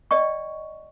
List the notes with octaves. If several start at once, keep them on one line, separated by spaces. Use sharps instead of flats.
D5 D#5 G5 C#6